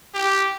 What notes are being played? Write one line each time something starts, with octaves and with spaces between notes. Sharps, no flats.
G4